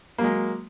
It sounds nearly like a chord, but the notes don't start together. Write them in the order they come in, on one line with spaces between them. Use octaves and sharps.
A#3 F#3 G#3